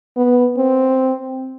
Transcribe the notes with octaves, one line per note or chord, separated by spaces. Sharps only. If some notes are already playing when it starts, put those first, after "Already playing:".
B3
C4